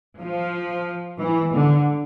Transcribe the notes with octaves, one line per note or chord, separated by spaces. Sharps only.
F3
E3
D3